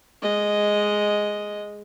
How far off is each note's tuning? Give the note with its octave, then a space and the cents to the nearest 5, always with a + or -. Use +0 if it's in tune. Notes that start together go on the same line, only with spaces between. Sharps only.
G#3 +0 D#5 +0